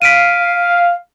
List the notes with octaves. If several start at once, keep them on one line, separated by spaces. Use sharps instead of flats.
F5 B6 D7 D#7